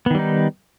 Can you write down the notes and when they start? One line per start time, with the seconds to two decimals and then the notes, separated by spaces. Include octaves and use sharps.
0.06 B3
0.10 D#3
0.15 G3
0.19 D#4